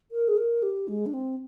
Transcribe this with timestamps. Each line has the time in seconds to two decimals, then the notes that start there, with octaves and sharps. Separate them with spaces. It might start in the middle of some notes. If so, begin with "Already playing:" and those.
0.12 A#4
0.28 G#4
0.37 A#4
0.63 G4
0.88 G#3
1.06 D4
1.14 C4